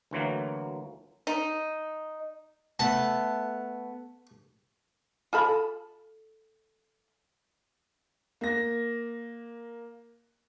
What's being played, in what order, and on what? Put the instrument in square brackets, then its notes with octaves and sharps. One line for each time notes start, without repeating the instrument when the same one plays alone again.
[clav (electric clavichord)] D2 E3 F#3 A#3
[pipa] D#4
[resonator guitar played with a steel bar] A3 B3 [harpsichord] A5
[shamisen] F4 A4 B5
[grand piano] A#3 A#6